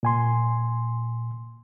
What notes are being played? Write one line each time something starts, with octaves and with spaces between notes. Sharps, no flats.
A#2 G#5 C6